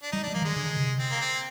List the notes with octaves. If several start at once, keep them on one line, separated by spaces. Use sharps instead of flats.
D4
G3 D#4
G3 D4
F3 A#3
D#3 G#3
D3
C3
C4
A#3
C4